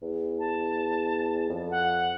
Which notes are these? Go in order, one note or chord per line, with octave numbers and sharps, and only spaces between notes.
E2
A5
F2
F#5